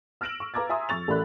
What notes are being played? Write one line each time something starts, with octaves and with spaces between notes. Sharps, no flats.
E6 F6 A#6 D7 E7 F#7
C#6
B4 F5 A#5 D6 G#6 A6
E5 G#5 A#5 C6 D#6 E6
F2 C#6 A6 F7
A1 A3 A#4 D5 B5 F#6